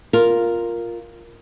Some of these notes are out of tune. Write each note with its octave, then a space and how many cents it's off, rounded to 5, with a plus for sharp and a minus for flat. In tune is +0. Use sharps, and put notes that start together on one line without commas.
F4 +0 A#4 +0